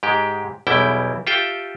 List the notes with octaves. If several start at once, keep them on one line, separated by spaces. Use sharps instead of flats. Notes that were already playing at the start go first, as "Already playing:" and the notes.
G#2 G#3 G4 G5
B1 E2 B2 G3 E4 G5
F4 G4 A4 E5 G5